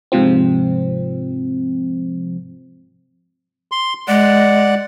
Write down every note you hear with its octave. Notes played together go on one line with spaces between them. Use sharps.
G#2 C3 F3 C4
C6
G#3 D5 F#5